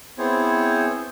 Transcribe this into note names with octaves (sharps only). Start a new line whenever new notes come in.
B3 C4 E4 G#4 C5 C#5